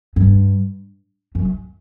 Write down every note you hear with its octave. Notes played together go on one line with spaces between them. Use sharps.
G2
F#2